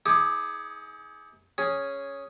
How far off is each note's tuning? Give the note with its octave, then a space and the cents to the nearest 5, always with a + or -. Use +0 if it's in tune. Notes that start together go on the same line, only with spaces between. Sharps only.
D#4 +40 G#4 +15 D6 +25
C#4 +0 G#4 +0